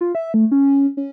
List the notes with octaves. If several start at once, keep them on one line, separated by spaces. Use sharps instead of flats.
F4
E5
A3
C#4
C#4